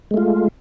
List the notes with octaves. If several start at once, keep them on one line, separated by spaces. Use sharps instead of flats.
G#3 A3 F4